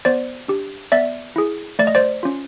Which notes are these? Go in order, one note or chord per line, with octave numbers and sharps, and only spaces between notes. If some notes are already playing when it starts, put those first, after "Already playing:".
B3 C5 D5
D4 G4
B3 D5 E5
E4 G#4
A3 D5
D#5
C5 D5
C#4 F4